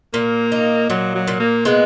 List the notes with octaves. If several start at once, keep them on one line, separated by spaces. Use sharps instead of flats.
A#2 A#3
D#4
A#2 F#3
F#3
A#2
A#3
G#3 B3